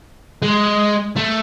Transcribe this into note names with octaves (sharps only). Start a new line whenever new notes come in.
G#3
A3